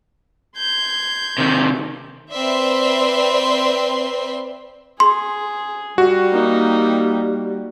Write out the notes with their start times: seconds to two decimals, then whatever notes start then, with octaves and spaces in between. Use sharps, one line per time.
0.57 C6 G6 G#6
1.38 C3 D#3
2.32 C4 B4 D5 E5 C6
5.00 G#4 C6
5.98 G3 F#4
6.32 A#3 D#4